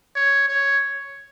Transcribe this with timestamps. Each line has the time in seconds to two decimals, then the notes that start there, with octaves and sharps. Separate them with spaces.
0.16 C#5
0.49 C#5